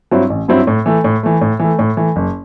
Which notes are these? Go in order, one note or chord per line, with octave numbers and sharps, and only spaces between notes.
G2 F#3 C4 E4
A1
G2 F#3 C4 E4
A2
E3 A3
A2
E3 A3
A2
E3 A3
A2
E3 A3
F#1